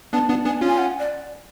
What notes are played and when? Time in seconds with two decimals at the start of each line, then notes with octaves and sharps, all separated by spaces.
0.13 B3 D4 A5
0.29 B3 D4
0.45 B3 D4 G#5
0.61 C#4 F4
0.68 G#5
0.78 F#5
0.99 D5